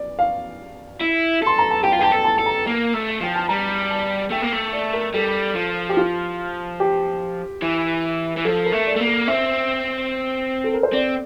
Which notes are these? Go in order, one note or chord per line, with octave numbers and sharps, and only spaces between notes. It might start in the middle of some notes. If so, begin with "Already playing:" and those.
Already playing: D5
F5
E4
A4 C6
A#5
A5
G4 G5
F4
G4 G5 A5
A4
A5
A4 A5
A#5
A#3
A3
F3 G5
A5
G3 A#5
A5
A3 G5
A#3
A3
D5
A#4
G3 A4
F3
G4
F4
G4
E3
E3
F3 A4
A#4
A3
D5
A3
A#3
A#4
C4 E5
A4
A#4
C5
C4 D5